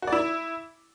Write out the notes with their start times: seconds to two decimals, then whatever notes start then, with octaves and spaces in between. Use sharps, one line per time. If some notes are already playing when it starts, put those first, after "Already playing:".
0.02 F#4
0.07 D5
0.12 E4